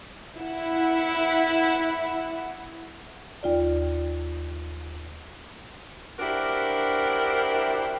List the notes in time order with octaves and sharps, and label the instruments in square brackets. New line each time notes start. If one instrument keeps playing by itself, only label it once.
[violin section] E4 F#5
[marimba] D#2 F4 D5
[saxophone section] D4 E4 F#4 G4 A#4 C5